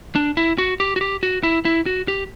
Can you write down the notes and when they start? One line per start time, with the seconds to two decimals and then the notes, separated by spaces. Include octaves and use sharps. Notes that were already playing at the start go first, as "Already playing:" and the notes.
0.15 D4
0.37 E4
0.58 F#4
0.80 G4
0.96 F#4
1.01 G4
1.23 F#4
1.43 E4
1.65 E4
1.86 F#4
2.08 G4